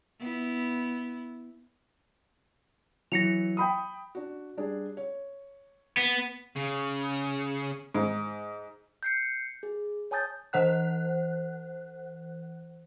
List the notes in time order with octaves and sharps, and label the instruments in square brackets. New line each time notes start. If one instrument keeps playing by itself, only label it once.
[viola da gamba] B3 E4
[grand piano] E3 F#3 [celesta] A#6 C#7 F7
[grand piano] G5 B5 D#6
[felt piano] D4 F#4
G3 D4 G#4
C#5
[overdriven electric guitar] B3
[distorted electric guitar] C#3
[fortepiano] G#2
[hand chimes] G6 C7 C#7
G#4
C#5 G#5 A5 D#6 G6 A6
[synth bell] E3 C5 F#5 F#6